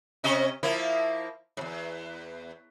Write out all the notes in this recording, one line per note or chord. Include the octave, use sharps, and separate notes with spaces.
C3 C#4 D#5
F3 A#3 E4
E2 G#2